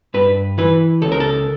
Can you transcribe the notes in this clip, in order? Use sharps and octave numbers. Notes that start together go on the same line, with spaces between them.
G2 B4
E3 B4
C#2 A4
A#4
A4